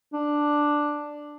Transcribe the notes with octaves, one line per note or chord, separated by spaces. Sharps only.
D4